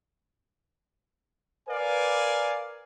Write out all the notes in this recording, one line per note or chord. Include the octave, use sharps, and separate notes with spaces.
A#4 B4 D5 F5 G#5